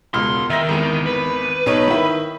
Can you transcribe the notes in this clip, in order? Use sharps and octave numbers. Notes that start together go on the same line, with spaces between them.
E1 C#2 C6 F6
D#3 E5 A#6
G#1 E2 D#7
B4
B1 D#4 C#5
D#3 E4